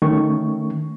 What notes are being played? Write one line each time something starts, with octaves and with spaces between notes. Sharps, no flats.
D#3 A3 C#4 C#6